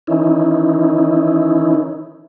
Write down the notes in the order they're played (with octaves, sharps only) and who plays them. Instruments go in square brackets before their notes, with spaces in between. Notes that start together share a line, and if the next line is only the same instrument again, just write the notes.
[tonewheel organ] D#3 E3 C#4 D#4 E4